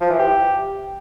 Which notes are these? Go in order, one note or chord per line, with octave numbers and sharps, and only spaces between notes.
F3
E3
G4